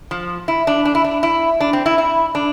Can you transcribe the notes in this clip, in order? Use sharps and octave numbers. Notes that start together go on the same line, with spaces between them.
F3
E4
D4
D4
E4
D4
E4
D4
C4
E4
E4
D4